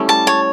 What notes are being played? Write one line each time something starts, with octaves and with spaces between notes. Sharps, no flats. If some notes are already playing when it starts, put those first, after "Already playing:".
Already playing: G3 A3 C#4 E4
A5
C#5